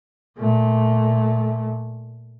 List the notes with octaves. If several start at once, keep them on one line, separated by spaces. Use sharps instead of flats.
A#2 A3